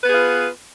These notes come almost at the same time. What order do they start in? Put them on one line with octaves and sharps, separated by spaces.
B4 B3 G#4 F4